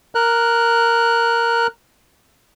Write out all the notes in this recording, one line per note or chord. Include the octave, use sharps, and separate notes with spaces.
A#4 F#6